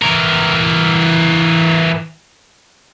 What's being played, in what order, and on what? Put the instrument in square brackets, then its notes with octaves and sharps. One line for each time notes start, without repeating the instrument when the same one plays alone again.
[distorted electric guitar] E3 A#4